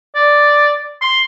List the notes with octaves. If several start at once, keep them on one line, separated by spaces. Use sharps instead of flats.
D5
C6